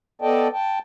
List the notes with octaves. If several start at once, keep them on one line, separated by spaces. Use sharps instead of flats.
B3 A4 D5 D#5 G5 A5
G5 A5